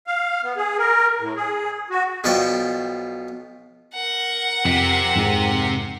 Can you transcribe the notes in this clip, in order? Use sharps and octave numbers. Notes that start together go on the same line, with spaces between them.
F5
B3
G#4
A#4
A2
G#4
F#4
B1 B2 F3 D5 G5 C#6
A#4 F#5
F2 C3
F2 G#2